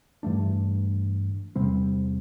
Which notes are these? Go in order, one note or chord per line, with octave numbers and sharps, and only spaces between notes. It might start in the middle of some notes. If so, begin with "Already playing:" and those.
G2 E3 A3 D4
E2 C3 G3 C4